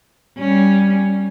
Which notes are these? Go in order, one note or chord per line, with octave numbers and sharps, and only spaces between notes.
G3 C#4